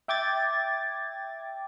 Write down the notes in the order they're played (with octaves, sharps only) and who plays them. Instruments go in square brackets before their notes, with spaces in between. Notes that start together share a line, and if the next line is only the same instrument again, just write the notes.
[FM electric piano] E5 G5 D6 G#6 A6